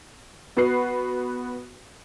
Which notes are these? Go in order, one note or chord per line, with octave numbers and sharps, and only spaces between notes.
B3 F#4 B4 C7